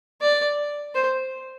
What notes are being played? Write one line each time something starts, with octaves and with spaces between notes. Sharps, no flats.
D5
C5